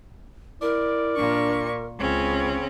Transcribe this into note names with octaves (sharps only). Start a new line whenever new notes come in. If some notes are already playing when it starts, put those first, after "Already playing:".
E4 A#4 D5
A#2 D4 C#6
C#2 C#3 C4 C#4